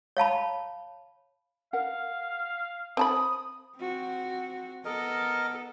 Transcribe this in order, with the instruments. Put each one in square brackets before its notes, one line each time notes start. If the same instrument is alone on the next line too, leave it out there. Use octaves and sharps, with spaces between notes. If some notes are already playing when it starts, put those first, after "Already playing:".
[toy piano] C#5 F5 A5 B5
[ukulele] A#4 F#5 [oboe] F5
[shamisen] C4 A5 B5 [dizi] D#6
[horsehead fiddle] C4 F#4
[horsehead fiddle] B3 A4 [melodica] A#4 D#5